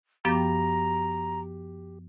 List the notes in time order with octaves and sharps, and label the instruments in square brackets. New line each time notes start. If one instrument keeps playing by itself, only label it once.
[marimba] F#2 F3 B3 [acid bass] G4 [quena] A#5